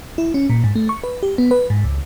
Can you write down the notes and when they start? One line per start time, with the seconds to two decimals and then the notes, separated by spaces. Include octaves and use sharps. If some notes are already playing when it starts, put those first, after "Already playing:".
0.18 E4
0.34 C#4
0.50 A#2
0.64 G#2
0.75 A3
0.89 C#6
1.04 B4
1.23 G4
1.38 B3
1.51 B4
1.70 G#2
1.84 C#2